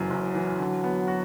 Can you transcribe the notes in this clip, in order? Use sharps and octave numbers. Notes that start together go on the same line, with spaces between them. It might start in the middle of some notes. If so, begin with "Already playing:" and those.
Already playing: F#1 F#2 E3 F#3
F#1
E3
D3
B3
F#4